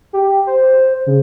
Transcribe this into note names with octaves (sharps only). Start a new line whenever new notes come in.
G4
C5
C#3